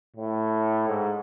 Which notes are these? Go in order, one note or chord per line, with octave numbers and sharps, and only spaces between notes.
A2
G#2